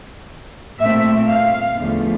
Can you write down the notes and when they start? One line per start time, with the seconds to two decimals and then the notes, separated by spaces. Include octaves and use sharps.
0.78 A#2 A3 C4 E5
1.27 F5
1.76 E2 D3 F3 A3